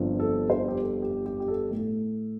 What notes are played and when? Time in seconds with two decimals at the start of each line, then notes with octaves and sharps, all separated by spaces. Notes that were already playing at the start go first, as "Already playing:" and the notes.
Already playing: G1 G2 F3 C4
0.20 A4
0.50 C5
0.68 G4
0.81 A4
1.02 G4
1.26 G4
1.40 G4
1.48 A4
1.70 A2 A3 A4